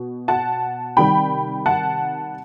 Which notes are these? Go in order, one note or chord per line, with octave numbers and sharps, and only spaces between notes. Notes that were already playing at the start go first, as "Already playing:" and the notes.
Already playing: B2
F#5 A5
C3 D#3 G3 G5 B5
F#5 A5